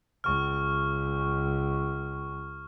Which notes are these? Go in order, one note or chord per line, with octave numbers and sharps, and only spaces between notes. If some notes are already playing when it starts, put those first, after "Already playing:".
C#2 C#6 F6